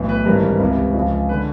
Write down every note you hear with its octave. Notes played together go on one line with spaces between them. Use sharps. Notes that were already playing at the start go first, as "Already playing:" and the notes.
Already playing: B1 A2 E3
B4
G#1 G2 E3 G3 A#4
C#2 C3 E3
C#2 C#3 F3
D3 B4